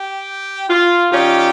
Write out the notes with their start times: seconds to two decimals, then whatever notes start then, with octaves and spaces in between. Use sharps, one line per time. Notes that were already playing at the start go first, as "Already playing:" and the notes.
Already playing: G4
0.69 F4
1.10 D#3 G3 C#4 F4 G4